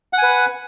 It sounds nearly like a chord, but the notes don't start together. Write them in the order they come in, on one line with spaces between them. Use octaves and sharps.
F#5 G#5 B4